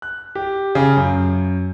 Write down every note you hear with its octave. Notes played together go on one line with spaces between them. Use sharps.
F#6
G4
C#3
F#2